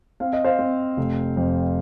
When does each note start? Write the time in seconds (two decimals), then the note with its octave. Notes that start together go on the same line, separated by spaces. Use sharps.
0.20 C4 F5
0.33 D#5
0.44 C5 F5
0.59 C4
0.97 F1
1.37 F2